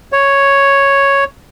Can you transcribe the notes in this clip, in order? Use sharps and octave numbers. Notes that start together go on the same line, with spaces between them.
C#5